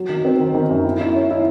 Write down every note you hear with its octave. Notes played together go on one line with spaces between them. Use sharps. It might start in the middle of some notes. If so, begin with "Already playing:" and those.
Already playing: F#3
D#3
C4
D#3
D#3
F#2
E4
E4
C#4
E4